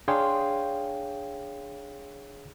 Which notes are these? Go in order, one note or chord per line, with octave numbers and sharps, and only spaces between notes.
D4 G#4 C#5 F5 G5 C6